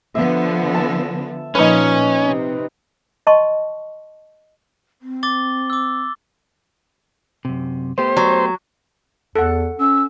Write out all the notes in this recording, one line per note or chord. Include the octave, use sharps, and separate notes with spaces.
D3 F3 B3 E5
A5
A#2 F3 C#4 D#4 B4
C3
D#5 A5 C6 C#6
C4
D6 A6 G7
D6 E6
F#2 C3
A3 B3 G4 C5
F#3
E2 A4 F#5
C#4 E6